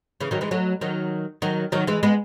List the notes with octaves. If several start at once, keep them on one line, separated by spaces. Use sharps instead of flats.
C#3 E3
D#3 F#3
E3 G#3
F#3 A3
D#3 F#3
D#3 F#3
D#3 F#3
E3 G#3
G#3 B3